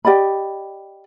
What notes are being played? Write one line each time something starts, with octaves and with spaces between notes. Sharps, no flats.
G4 D5 D#5 B5